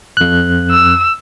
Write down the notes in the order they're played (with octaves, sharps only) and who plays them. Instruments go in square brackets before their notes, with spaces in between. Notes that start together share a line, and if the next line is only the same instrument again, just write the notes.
[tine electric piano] F2 F#6
[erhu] E6